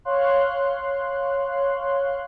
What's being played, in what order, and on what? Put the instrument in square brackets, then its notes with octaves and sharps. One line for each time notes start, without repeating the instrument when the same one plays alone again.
[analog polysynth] C#5 F5 C6 F#6